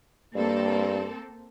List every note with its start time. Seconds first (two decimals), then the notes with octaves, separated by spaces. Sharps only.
0.35 G2 A#3 C4 A4